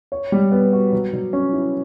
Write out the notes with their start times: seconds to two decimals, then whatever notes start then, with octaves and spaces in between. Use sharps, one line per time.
0.12 C#5
0.32 G3
0.52 B3
0.73 F#4
0.93 F#3
1.13 F#3
1.33 C#4
1.53 E4